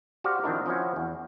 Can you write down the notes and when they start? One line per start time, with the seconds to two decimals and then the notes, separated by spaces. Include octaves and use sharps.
0.24 F#4 G4 C5 D5 F5
0.43 D#3 F3 C4 D4 E4 A#4
0.66 F3 C4 C#4 E4 F#4
0.96 E2